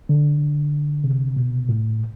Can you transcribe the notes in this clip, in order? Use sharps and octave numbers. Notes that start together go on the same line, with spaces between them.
D3
C3
B2
A2